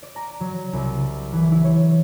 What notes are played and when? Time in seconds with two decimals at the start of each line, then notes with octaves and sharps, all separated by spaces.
0.03 D5
0.16 A#5
0.40 F#3
0.73 C2
1.33 E3
1.51 E4
1.64 C#5